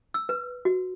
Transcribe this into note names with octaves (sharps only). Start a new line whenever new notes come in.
E6
B4
F#4